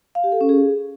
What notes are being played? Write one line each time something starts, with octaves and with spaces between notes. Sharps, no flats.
F5
G4
A4
C#4
G#4